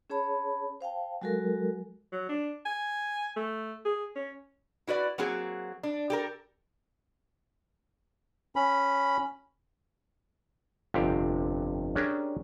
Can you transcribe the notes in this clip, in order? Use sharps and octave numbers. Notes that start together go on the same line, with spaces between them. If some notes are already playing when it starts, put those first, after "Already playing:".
C#4 G#4 C#5 A5 B5
C5 F5 G5 A5
F#3 G#3 F#4 A4 A#4
F#3
D4
G#5
A3
G#4
C#4
E4 F#4 B4 D5
F#3 A#3 C4 F#4 G#4
D4
G4 A4 A#4
C#4 B5
G1 F2 C3 G4 F5
C#4 D4 G4 G#4 A#4